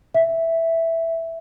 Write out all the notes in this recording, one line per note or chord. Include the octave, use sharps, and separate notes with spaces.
E5